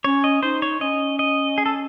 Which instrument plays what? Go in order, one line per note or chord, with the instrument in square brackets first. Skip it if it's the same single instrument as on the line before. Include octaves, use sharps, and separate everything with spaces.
[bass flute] C#4 [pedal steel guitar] C#5
[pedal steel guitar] D#5
[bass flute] D#4 [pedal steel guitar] C5
[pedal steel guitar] C#5
[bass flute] C#4 [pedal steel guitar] D#5
[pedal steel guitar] D#5
G#4
A4